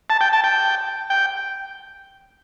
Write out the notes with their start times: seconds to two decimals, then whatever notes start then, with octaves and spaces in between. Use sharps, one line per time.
0.10 A5
0.21 G5
0.33 A5
0.44 G5
1.10 G5